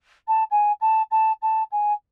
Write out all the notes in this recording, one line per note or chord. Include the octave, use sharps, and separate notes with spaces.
A5
G#5
A5
A5
A5
G#5